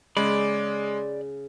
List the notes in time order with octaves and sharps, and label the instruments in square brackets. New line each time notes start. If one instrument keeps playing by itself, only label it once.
[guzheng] C#3 [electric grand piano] G#3 [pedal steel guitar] D5 B5